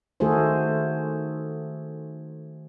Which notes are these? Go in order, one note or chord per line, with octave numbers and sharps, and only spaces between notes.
D#3 A3 F#4 G#4 A4 C5